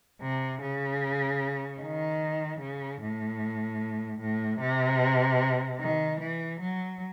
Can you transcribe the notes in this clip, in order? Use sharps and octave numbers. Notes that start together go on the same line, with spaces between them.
C3
C#3
D#3
C#3
A2
A2
C3
D#3
E3
F#3